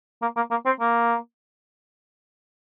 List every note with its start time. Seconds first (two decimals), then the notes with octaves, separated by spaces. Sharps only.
0.22 A#3
0.36 A#3
0.51 A#3
0.66 C4
0.80 A#3